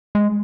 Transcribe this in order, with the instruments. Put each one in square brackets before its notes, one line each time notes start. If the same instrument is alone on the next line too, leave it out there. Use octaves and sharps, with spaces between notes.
[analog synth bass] G#3